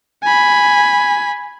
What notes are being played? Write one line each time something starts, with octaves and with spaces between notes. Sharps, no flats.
G#5 B5